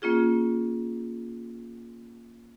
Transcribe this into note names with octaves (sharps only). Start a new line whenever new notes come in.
A#3 C#4 F4 G#4